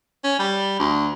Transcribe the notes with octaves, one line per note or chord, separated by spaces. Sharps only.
C#4
G3
D2